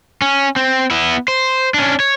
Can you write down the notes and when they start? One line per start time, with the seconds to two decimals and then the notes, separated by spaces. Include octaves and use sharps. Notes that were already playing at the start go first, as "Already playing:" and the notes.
0.22 C#4
0.56 C4
0.91 B3 E4
1.28 C5
1.74 C#4 D4
2.00 C#5